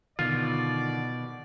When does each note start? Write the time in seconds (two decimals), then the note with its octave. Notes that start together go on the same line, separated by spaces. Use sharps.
0.19 B2 D3 D#3 F4 D5